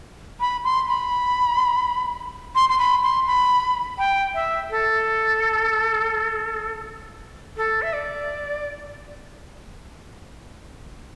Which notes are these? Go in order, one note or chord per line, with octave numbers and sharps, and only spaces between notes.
B5
C6
B5
C6
C6
B5
C6
B5
G5
E5
A4
A4
E5
D5